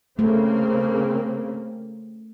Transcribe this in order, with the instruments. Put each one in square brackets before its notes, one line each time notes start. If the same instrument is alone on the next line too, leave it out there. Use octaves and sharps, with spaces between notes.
[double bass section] C#3 A#3 C4 [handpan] A3